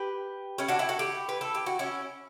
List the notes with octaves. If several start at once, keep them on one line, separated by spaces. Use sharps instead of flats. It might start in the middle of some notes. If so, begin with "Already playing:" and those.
Already playing: G4 B4
C#4 E4
D4 F#4
E4 G4
F#4 A4
E4 G4
B4
A4
G4
F#4
C#4 E4